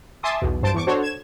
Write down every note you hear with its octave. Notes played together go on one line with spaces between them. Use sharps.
E5 G#5 A5 C6 D6 D#6
B1 E2 B2
G2 C5 A5 D7
E2 C#6 D6
D4 F#4 A4 C5 C#5
G#6 E7